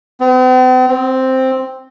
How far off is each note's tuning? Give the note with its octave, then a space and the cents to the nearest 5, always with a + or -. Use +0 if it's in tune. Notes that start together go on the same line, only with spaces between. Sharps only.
C4 -45
C4 +0